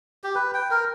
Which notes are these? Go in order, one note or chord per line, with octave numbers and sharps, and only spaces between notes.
G4
B4
G5
A#4